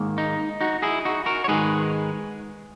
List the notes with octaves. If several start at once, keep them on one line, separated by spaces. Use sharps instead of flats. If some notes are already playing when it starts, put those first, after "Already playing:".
Already playing: G#2 D#3 A#3
D#4
D#4 F#4
E4 G#4
D#4 F#4
F#4 A#4
C#5
G#2 D#3 G#3 G#4 B4